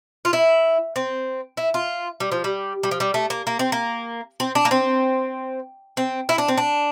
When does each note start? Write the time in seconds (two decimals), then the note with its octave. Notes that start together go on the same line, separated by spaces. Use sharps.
0.25 F4
0.33 E4
0.96 C4
1.57 E4
1.74 F4
2.20 G3
2.32 F3
2.44 G3
2.83 G3
2.91 F3
3.00 G3
3.14 A3
3.30 A#3
3.47 A#3
3.59 C4
3.72 A#3
4.40 C4
4.55 D4
4.65 A#3
4.71 C4
5.97 C4
6.29 E4
6.38 D4
6.48 C4
6.57 D4